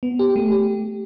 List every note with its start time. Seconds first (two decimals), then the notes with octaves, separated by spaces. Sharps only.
0.03 B3
0.19 G4
0.36 A3
0.52 G4